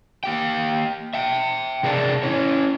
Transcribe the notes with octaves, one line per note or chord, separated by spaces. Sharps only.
A#3 G4 G5
E5 G5
C3 G#4 A#4 C5 D5 A5
C#4 E4 C#5